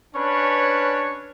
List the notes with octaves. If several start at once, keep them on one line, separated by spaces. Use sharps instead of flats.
C#4 D4 B4 C#5